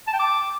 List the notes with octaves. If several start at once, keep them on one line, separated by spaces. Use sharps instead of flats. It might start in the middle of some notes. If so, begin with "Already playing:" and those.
A5
G5
D6